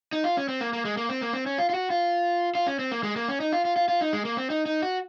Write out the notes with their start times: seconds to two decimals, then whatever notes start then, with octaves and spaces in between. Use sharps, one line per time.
0.13 D#4
0.24 F4
0.37 C#4
0.49 C4
0.61 A#3
0.73 A#3
0.85 G#3
0.97 A#3
1.09 C4
1.21 A#3
1.33 C4
1.46 C#4
1.58 F4
1.70 F4
1.74 F#4
1.90 F4
2.55 F4
2.67 C#4
2.79 C4
2.92 A#3
3.03 G#3
3.16 A#3
3.29 C#4
3.40 D#4
3.53 F4
3.65 F4
3.76 F4
3.88 F4
4.01 D#4
4.13 G#3
4.25 A#3
4.37 C4
4.50 D#4
4.66 D#4
4.82 F#4